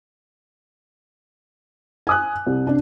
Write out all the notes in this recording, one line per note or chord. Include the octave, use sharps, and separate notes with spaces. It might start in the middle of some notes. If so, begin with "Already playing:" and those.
G#5 D#6 F#6
C2
C3 D4